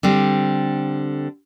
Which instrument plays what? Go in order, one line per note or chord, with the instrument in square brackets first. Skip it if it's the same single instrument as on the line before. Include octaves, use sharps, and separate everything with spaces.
[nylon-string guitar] D3 G3 C4